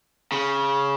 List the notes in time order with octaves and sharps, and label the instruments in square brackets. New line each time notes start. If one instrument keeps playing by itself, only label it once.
[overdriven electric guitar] C#3